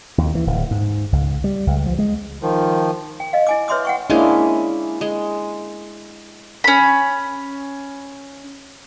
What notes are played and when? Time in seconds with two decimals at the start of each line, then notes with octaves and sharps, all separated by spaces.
0.18 D#2
0.35 E3
0.47 D1
0.71 G#2
1.12 C#2
1.44 G3
1.67 C#2
1.86 F3
1.99 G#3
2.42 D#3 F3
3.20 G5
3.33 D#5 F5
3.47 E4 G#5 D6
3.68 B4 C#5 E5 C6 D6 D#6
3.85 F#5 G5 C#6
4.10 G#3 A#3 C#4 D4 E4
5.01 G#3
6.64 C#4 B5